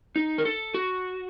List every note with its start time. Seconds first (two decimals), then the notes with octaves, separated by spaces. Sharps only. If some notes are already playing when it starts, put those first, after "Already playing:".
0.16 D#4
0.38 A#4
0.45 A4
0.74 F#4